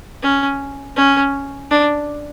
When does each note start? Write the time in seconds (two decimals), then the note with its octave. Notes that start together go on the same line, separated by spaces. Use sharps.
0.23 C#4
0.96 C#4
1.71 D4